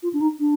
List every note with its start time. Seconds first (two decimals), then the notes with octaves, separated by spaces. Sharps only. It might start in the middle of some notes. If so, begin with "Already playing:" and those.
0.03 F4
0.13 D4
0.21 D#4
0.40 D4